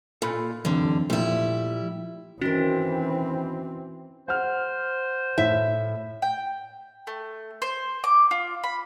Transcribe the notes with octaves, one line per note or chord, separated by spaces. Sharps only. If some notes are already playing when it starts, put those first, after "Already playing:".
A#2 A4 G#5 B5
D3 E3 F#3 G3 C4
A#2 F3 G3 A3 E4
E2 D#3 E3 C4 C#4 F#4 A#4
C5 F#5 F6
A2 E5
G5
A3
C5
D6
F4
B5